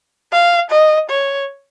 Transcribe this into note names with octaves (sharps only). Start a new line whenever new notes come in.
F5
D#5
C#5